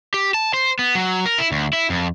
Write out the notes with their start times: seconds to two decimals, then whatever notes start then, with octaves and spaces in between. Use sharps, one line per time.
0.14 G4
0.34 A5
0.54 C5
0.79 B3
0.95 F#3
1.26 A#4
1.38 E4
1.52 D2
1.73 E4
1.90 F2